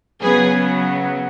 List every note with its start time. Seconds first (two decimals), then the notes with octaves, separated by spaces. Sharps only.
0.21 C#3 F#3 B3 G#4 B4